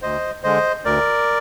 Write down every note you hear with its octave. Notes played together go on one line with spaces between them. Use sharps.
D2 C5 D#5
D3 G#3 C5 D#5
D2 A#4 D5